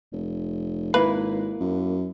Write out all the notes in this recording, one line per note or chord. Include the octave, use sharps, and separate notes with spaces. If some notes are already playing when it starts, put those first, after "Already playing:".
F1
G#1 A#3 E4 B4
F#2